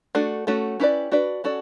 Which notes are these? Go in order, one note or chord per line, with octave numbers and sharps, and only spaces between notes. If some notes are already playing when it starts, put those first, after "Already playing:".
A3 D4 F#4 A4
A3 C#4 F#4 A4
C#4 E4 G4 B4 D5
D4 F#4 B4 D5
C#4 F#4 A4 D5